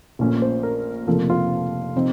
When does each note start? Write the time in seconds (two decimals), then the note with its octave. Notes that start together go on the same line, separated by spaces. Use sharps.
0.19 A#1 A#2 A3 C#4
0.42 C5
0.63 A#4
1.07 F1 F2 C#3 F3 A#3 A4
1.30 F4
1.95 C3 F3 C4 D#4